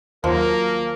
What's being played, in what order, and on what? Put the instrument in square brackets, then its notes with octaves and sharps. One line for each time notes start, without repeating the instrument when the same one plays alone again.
[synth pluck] D#2 F#3 [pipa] F3 [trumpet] A#3 [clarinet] A#4